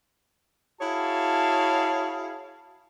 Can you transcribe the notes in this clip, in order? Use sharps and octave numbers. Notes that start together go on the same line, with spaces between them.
E4 F#4 G#4 C#5 F5 A5